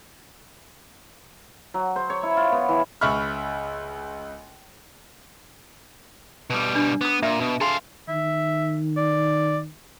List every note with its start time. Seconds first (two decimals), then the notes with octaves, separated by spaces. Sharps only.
1.74 F#3
1.96 C5
2.10 C#5
2.23 E4
2.37 F4
2.52 B3
2.69 E3
3.01 C#2 E5 B5 C#6 F6
6.50 B2 G3
6.75 D4
7.01 B3 D6 D#6
7.23 A#2 E5
7.40 B2
7.61 G#4 A4 F5 G#5 C6
8.09 D#3 E5
8.97 D5